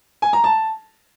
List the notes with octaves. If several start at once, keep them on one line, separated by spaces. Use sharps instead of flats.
G#5
A#5
A5